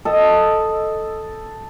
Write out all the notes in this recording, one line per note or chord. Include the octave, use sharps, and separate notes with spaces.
A4 D#5